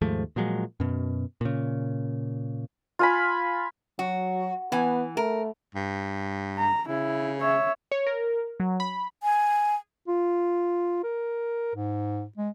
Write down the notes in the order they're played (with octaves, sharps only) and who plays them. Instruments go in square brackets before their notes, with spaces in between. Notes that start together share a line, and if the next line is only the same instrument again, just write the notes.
[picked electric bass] D#2 G#2 F3 A3
A#2 F3 F#3 G#3
F#2 B2
A#2 C#3
[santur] F4 G#5 B5
[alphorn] F#3 [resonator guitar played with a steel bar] F#4
[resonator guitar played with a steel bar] E3 G#5 [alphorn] B3
[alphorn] A3 [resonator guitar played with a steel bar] A#4
[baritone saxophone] G2
[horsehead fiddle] A#5
[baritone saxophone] C#3 [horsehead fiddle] E4
[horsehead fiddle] C#5 E5
[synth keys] C#5
A#4
F#3
B5
[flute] G#5
[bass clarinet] F4
A#4
G#2
G#3